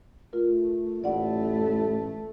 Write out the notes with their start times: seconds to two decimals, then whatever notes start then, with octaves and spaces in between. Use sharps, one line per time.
0.33 A3 F4 A#4
1.04 A1 A3 E4 D5 F#5